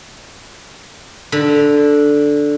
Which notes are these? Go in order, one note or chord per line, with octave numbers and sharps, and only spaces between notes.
D3